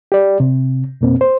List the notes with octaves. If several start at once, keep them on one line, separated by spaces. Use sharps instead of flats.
G4 D5
C3
F2 B2 A#3 C4
C5